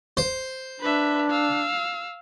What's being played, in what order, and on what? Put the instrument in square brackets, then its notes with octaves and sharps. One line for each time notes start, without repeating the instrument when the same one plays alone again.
[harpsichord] C5
[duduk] D4 [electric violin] B4 E5
[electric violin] F5 E6